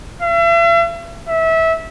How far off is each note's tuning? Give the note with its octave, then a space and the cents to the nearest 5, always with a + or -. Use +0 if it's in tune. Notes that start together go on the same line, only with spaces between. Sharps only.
E5 +45
E5 -20